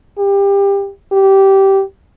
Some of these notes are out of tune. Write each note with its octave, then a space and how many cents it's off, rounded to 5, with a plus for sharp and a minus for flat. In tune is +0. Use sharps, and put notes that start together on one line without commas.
G4 +25
G4 -15